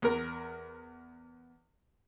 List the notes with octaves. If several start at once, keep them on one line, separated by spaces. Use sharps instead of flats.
E2 A#4